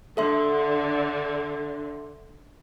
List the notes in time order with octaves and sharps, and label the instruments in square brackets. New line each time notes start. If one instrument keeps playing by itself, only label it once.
[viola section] D3 [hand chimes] A4 E5 C6